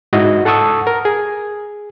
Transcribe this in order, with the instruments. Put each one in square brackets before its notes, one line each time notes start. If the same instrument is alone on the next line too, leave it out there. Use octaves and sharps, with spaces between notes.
[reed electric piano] G#2 E4 F#4 D#5
A4 F#5 A5 C#6 D#6 E6
A#4
G#4